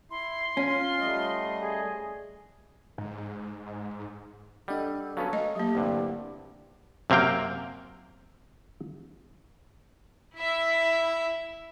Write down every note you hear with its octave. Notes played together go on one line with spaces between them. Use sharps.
E4 C6
C#4 F4
G3 A3 D#5
G#4
G#2
G3 D4 A4 D#5 F#5
F#3 B3 C#4 F5 A5 C#6
A3 D#5 A#5
F#3 A#3 G4
C2 G2 D3
F#2 C3 A#3 F5 G5
E4 E5